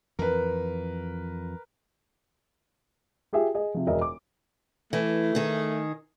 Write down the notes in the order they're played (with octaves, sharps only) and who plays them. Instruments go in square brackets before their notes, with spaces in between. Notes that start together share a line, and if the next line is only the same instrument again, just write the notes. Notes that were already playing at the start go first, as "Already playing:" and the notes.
[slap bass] F2 E3 [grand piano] A#4 B4
[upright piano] F4 G4 G#4 E5
G#4 D#5
C3 F3
E1 A#4 D#5 E5
D6
[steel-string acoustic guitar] E3 [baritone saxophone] A3
[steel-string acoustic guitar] D#3 G#4